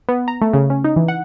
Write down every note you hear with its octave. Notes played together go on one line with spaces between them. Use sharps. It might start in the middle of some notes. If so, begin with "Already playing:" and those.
B3
A#5
A3
C#3
C#4
D#4
E3
F#5